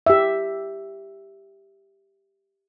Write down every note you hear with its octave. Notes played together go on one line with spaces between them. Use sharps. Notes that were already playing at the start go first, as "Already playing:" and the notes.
G4 E5